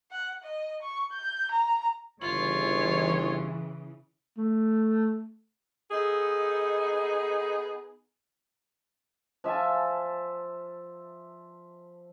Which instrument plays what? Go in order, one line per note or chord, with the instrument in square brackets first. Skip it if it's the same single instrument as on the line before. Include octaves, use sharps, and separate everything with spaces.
[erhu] F#5
D#5
C#6
G6
A#5
[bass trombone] G1 [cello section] C#3 E3 [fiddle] F4 [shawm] C#5
[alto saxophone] A3
[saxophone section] B3 D#4 G#4 A4
[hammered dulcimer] F3 E5 G#5 A5